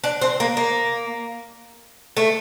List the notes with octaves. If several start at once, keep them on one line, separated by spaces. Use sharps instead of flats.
D4
C4
A#3
A#3
A3